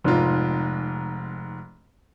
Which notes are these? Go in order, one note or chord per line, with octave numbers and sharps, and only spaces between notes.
F1 G#2 F4